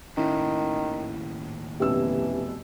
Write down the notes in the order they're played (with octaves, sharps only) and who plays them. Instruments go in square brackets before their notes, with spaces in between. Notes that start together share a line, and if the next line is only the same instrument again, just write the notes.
[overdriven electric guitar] D#2 A2 [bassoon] D#3 [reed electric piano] C#4 E4
[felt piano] F1 B2 E6 [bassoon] E3 [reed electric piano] C#4 G4